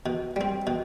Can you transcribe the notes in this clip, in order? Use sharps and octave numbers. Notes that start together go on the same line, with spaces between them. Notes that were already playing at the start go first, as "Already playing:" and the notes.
B2
G3 C4
B2